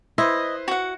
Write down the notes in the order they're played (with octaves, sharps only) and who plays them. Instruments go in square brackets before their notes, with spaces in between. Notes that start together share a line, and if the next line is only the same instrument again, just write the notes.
[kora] E4 [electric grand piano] B4 C5 C6 [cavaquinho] D#5
[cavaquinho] F#4 F#5